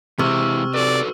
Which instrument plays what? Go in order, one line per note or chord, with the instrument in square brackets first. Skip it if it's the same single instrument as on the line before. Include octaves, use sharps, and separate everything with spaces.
[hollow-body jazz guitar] C3 [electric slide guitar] E3 G#3 E4 [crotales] C#6 E6 F6
[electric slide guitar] F#4 A4 B4 [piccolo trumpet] D5